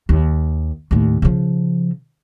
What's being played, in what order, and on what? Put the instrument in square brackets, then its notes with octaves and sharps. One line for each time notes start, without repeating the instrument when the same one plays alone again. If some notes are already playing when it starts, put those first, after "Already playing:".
[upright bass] D#2
D#2 A2
C#3 F3